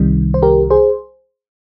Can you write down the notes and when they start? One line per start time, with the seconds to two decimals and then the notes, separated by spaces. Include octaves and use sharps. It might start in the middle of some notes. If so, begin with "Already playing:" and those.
Already playing: C2 C3 D#3 G3
0.34 C5
0.42 G4 A#4
0.70 G#4 C5